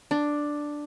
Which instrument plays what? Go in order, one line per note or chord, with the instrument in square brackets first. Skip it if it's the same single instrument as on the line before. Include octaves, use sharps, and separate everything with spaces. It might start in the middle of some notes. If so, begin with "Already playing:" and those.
[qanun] D4